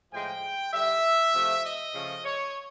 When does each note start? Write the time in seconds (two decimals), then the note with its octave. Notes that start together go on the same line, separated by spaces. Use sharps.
0.11 A2 F3 G#3 G5
0.72 D3 G3 E5
1.33 C3 F3 A3
1.63 D#5
1.94 C#3 F3 A3
2.24 C#5